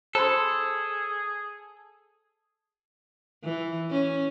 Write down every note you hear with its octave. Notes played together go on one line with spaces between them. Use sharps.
G#4 A4 C5 B5 C6
E3
C#4